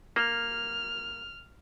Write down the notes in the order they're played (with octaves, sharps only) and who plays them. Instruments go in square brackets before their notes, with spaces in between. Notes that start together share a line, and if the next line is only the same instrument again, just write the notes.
[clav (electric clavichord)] A#3 [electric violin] F6